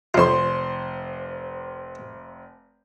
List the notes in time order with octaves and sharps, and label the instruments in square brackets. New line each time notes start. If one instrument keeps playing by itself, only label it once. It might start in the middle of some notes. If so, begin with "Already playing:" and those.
[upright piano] F1 C5 C6 [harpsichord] F2 F4